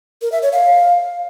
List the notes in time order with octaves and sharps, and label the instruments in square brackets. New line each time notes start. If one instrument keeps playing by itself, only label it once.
[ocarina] A#4
E5
C#5
F5